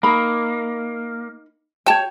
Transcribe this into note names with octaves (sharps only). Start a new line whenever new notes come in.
A#3 D#4 B5
F#4 C#5 G5 A5